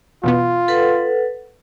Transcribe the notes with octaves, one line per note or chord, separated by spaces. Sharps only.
E2 B2 B3 F4
A4 B4 F#5